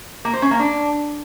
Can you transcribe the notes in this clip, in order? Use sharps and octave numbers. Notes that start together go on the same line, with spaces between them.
A#3
C5
C#4
A#3
D4